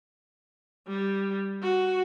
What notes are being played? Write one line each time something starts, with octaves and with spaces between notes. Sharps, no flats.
G3
F#4